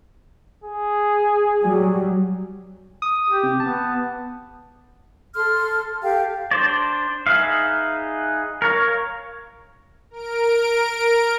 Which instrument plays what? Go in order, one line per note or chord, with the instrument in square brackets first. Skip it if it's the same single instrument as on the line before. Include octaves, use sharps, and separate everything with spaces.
[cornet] G#4
[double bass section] F#3 G3
[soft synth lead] D#6
[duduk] G4
[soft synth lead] C3
[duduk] B3 [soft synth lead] A5
[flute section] A4 C6 F6
G4 A4 F5 G5
[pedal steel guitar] D4 C5 D5
D#4 G#4 B4 E5 F5
A#4 C#5 F5
[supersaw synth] A#4 D7